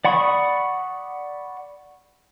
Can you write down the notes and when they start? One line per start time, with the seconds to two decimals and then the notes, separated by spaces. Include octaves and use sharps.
0.05 D5 F#5 B5 C#6 D#6